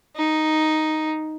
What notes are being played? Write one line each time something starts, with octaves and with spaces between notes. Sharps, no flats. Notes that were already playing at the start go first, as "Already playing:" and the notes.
D#4